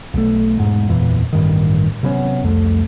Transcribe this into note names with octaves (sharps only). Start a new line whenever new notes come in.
B1 A3
E1 G#2
F#1 E2 A#2 E3
A1 G2 D#3
C3 F#3 B3 C#4
C2 F2 A3